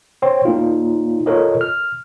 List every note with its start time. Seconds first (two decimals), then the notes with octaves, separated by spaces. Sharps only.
0.22 C5 C#5 G5 C6
0.45 A#3 D#4 F4
1.26 F4 A4 A#4 C#5 D#5
1.61 F6